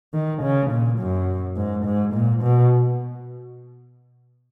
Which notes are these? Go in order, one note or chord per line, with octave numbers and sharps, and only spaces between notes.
D#3
C#3
A#2
F#2
G#2
G#2
A#2
B2